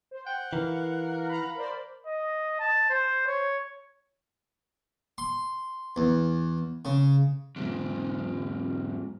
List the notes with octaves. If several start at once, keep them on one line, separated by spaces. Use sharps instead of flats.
C5
F#5 G5
E3 A#4 F5
F5 A#5 B5 F#6
A#4 C5 D5
D#5
A5
C5
C#5
C6
E2
C#3
E2 G#2